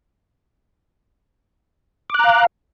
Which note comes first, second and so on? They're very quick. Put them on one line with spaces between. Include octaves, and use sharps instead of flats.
D6 F#6 A#5 F5